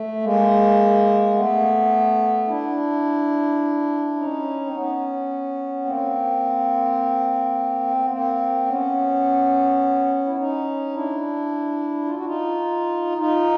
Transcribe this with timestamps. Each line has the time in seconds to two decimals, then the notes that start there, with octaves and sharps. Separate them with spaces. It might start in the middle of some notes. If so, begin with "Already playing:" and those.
Already playing: A3
0.22 G#3 A#3
1.34 A3 B3
2.48 D4 E4
4.16 C#4 D#4
4.66 C4
4.73 B3 C#4
5.85 A#3 C4
7.96 A#3
8.04 B3
8.10 A#3 C4
8.66 B3 C#4
10.26 E4
10.36 C#4 D#4
10.92 D4 E4
12.05 F4
12.15 F#4
12.25 D#4 F4
13.18 D#4 F4